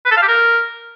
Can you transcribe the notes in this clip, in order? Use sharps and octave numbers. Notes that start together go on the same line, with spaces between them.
B4
A4
F5
G4
A#4